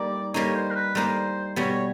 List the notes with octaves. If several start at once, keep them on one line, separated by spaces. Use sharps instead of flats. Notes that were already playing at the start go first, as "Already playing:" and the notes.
Already playing: G3 A#3 D#4 D5
G3 A#3 D#4 C#5
C5
A#4
B4
G3 A#3 D#4 C5
B2 G3 B3 C#5
C#5